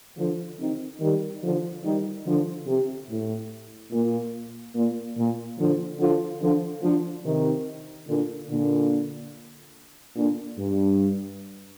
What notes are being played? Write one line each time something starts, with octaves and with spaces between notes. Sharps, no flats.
D3 F3
C3 D#3
D#3 G3
D3 F3
D#3 G3
D3 F3
C3
A2
A#2
A#2
A#2
D3 F3
D3 F3
D3 F3
D3 F3
C3 D#3
A#2 D3
A#2 D3
A#2 D3
G2